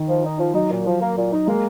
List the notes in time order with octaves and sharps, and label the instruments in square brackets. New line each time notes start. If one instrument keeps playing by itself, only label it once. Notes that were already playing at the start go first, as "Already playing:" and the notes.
Already playing: [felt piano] D#3
[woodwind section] F3
D#4
F3
[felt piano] F#3 [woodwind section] D#4
[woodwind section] A#2
F3
A#3
A#2
D#4
[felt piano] G#3 [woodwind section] A#3